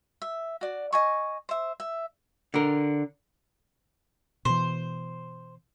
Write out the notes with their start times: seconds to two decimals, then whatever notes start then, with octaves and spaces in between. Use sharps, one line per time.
0.22 E5
0.61 F#4 D5
0.93 D#5 G#5 C#6
1.49 C5 E5
1.80 E5
2.54 D3 A#4
4.45 B2 E3 C5